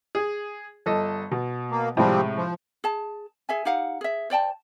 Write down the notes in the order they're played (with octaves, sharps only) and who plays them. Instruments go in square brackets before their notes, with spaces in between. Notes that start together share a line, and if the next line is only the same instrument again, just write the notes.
[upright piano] G#4
G1 A4 D#5
B2
[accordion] A#3
[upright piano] A2 C3 G#3 [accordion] F3 G3 C4
[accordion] F3
[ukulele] G#4 A5
G#4 E5 G#5
D#4 G4 F5 F#5
G#4 E5
C5 D5 G5 A5